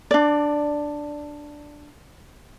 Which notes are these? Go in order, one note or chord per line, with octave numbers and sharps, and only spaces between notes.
D4 D5